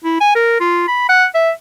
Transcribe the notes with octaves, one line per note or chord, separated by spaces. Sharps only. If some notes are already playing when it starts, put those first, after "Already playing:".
E4
G#5
A#4
F4
B5
F#5
E5